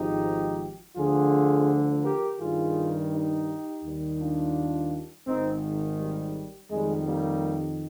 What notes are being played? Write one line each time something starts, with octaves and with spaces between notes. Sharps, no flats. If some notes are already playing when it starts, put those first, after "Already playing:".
Already playing: G#1 G#2 F3 D#4 G4
D2 D3 F3 F4 G#4
G4 A#4
G2 D#3 G3 F4 G#4
D#4 G4
D#2 D#3 G3
D4 F4
G#1 G#2 D#3 C4 D#4
G3
F2 D#3 G3 G#3
G3 A#3